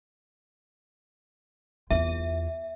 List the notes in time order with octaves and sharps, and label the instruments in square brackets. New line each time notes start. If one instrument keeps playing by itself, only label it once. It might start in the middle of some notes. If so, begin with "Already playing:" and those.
[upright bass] E2 F4 [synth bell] E5